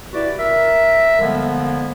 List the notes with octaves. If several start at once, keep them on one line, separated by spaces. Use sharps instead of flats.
E4 F#4 G4 B4 D5
A#4 E5
D3 F3 G3 G#3 A#3 B3